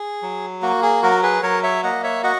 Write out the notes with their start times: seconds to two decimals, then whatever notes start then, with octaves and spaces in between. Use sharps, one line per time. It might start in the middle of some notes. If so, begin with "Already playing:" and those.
Already playing: G#4
0.22 F#3
0.62 A#3 F#4
0.82 G#4
1.03 F#3 F#4 A#4
1.23 G#4 B4
1.43 F#3 A#4 C#5
1.63 C#5 E5
1.83 A#3 D#5 F#5
2.04 C#5 E5
2.23 F#4 D#5 F#5